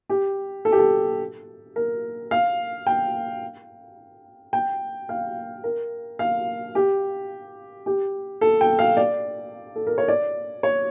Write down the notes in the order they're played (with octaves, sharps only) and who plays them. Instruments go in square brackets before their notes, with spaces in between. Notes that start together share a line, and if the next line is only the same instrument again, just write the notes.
[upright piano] G4
A4
G4
A4
A#4
F5
G5
G5
F5
A#4
F5
G4
G4
A4
G5
F5
D5
A4
A#4
C#5
D5
C#5